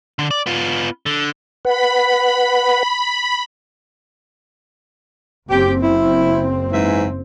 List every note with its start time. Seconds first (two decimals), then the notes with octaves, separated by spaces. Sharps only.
0.19 D3
0.31 D5
0.46 B3 F4
1.06 D3
1.65 B4 F#5 B5
5.49 F#1 C4 G4
5.82 E4
6.72 G#2 E3 E5